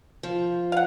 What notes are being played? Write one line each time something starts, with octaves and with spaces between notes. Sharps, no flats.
F3
F5 F#5